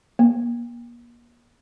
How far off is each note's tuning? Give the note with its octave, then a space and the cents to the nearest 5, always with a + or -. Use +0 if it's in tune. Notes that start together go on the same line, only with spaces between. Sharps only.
A#3 +35